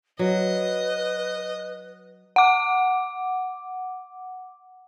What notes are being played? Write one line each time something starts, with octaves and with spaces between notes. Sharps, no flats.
F#3 B4 D#5
F#5 D6